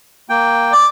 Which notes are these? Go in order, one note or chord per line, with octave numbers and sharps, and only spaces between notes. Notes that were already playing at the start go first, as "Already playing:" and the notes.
A#3 G5
D5